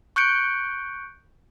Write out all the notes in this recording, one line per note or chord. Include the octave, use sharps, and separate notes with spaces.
C#6 F#6 G6 C#7 D7